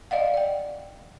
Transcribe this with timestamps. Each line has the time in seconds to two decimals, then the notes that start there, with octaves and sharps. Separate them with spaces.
0.11 D5 D#5 F5 F#5
0.34 D5 G5